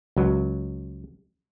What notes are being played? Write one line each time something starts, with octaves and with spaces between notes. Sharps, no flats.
C#2 F#3